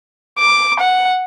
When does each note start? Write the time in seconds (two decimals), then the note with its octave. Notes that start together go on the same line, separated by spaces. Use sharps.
0.38 D6
0.80 F#5